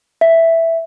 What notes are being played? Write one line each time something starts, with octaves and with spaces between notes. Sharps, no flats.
E5